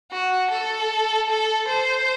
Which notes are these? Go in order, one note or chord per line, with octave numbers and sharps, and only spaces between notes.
F#4
A4
A4
C5